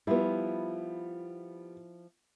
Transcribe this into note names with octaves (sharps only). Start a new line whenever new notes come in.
F3 G3 B3 E4 F4